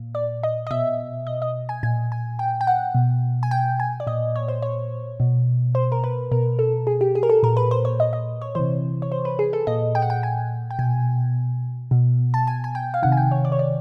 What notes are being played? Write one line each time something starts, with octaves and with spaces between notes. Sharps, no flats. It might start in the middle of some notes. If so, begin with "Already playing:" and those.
Already playing: A#2
D5
D#5
D#5
B2 E5
D#5
D#5
G#5
A#2 G#5
G#5
G5
G5
F#5
B2
G#5
G5
G#5
D5
A#2 D#5
C#5
C5
C#5
B2
C5
A#4
B4
B2 A#4
A4
G#4
G4
G#4
A#4
A4
A#2 A#4
B4
C5
C#5
D#5
D#5
C#5
C3 E3 C5
C#5
C5
B4
G#4
A4
A#2 D#5
G5
F#5
G5
G#5
G5
B2 G#5
B2
A5
G#5
G#5
G5
F5
C3 D#3 F#5
G#5
G5
C#5
D5
C#5
D5